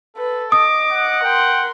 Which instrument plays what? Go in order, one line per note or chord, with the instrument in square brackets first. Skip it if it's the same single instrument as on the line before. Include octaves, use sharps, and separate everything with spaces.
[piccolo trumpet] A4 [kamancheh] B4
[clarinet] D#5 [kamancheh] D6 [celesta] D#6
[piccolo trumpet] F#5
[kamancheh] A#4 C6 [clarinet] G5